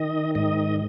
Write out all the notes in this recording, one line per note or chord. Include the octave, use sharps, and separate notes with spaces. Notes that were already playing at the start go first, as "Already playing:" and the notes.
Already playing: D#3 D#5
G#2 D#5